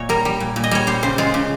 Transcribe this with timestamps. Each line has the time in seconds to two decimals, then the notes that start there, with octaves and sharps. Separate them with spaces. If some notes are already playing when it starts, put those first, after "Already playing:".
Already playing: A#2 C#5 D#5
0.09 G3 A#4
0.25 G3
0.40 A#2
0.56 A#2
0.64 D#5
0.71 G3 C#5
0.87 G3 C5
1.03 C#3 C5
1.18 G#3 F4
1.34 C#3